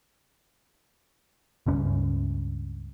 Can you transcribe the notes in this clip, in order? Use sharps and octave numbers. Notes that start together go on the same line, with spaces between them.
C#2 G2 C#4